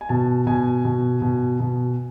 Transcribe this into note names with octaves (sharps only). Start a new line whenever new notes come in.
G#5
B2 A5
B2 G#5
B2
B2
B2